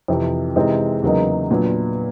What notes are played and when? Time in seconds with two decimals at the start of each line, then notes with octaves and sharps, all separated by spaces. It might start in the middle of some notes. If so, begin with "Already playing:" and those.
0.08 F2 C3 E3
0.56 C3 E3 G#3 C4 D#4
1.02 E2 C#3 F#3 A#3 D#4
1.51 A#2 F#3 B3 D4